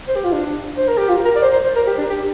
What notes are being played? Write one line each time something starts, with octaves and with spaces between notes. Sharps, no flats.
C5
G4
F4
D4
C5
A#4
G4
F4
A#4
D5
C5
C5
C5
A#4
G4
D4
G4